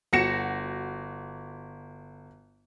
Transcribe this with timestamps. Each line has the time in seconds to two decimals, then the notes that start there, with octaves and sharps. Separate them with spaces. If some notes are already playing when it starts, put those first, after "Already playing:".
0.13 G1 F#4 A#6 C#7 E7